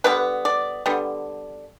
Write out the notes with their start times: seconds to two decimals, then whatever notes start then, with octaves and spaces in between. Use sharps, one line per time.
0.04 D3 G3 B3 B4
0.45 D5
0.86 D3 G3 B3